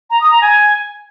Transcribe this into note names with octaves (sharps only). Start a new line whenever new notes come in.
A#5
D#6
A#5
G#5